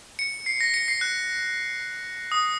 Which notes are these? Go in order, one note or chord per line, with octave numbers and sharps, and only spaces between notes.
C#7
C7
A#6
C#7
C7
F#6
D#6